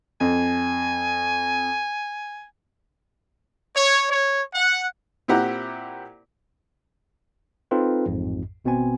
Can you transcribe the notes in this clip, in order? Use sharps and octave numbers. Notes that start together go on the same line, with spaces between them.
F2 G#5
C#5
C#5
F#5
A#2 C4 E4 G4 F#5 A#5
C4 D#4 F4 A4 B4
A1 F2 G#2
G#1 B2 B3 C4 G#5